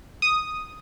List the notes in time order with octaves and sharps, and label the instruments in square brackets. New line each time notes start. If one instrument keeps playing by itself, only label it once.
[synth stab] D#6